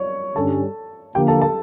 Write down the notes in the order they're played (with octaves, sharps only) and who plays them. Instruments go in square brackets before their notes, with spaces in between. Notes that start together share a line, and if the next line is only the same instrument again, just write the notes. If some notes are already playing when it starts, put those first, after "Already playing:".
Already playing: [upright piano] C#5 D5 C#6
[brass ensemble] G2 D3 G3 C#4 [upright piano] A4 A5
[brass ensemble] D3 F3 A#3 [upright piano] G4 G5
[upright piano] A4 A5
A4 A5